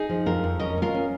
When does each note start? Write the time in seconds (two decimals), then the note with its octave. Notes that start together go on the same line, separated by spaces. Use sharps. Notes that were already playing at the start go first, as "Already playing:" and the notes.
Already playing: D#4 G#4
0.09 F3
0.26 F2 F4 A#4
0.44 F2
0.59 C#4 A#4 D#5
0.78 C#4 F4 A#4
0.94 C#4